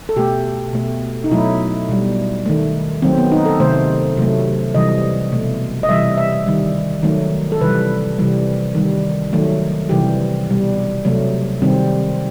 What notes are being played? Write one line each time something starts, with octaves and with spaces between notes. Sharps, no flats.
A4
B2 A3 G4
B2 A3
D#4
B2 F#3 A3 E4
B2 G3
D#3 A3
D#3 F#3 A3 C4
B3
D#4
A4
C3 D#3 A3 C5
C3 F#3 A3
C3 E3 G3 D#5
B2 A3
D#5
C3 E3 G3 E5
E5
D#3 G3
D#3 F#3 A3
A4
C3 E3 G3 B4
C3 E3 G3
D#3 G3
D#3 F#3 A3
C3 E3 G3 G4
B2 G3
C3 F#3 A3
C3 D#3 G3 C4